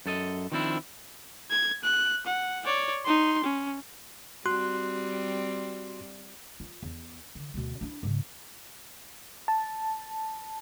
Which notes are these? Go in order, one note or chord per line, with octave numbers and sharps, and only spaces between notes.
F#2 A4 D#5
D#3 F3 C4 D4 E4
G#6
F#6
F#5
C#5 D5
D#4 C6
C#4
G3 C4 F#4 C6 F#6
F4
E2
D3
D2 B2
D4 E4
G#2 C#3
A5